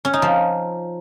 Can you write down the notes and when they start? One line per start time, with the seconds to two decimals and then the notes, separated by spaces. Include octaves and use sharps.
0.05 C#4
0.13 D#4
0.22 F3